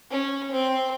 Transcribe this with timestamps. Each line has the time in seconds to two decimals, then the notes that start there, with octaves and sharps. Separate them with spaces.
0.10 C#4
0.51 C4